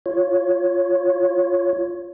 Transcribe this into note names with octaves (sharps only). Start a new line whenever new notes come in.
F4 C#5